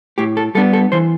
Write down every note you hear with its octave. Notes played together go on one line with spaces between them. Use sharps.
A2 G4
A4
G3 B3 D4 A4
A4
E3 C5